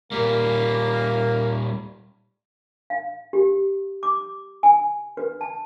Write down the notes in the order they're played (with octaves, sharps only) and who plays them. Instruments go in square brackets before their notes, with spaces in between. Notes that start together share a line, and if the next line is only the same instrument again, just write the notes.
[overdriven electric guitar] A#2 G3 [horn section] A#3
[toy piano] F5
G4
D6
G#5
B4
A5